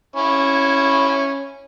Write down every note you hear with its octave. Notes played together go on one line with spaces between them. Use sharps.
C#4 E4